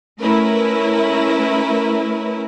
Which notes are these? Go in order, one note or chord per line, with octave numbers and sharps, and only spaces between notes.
A3 C#4 E4 A#4 B4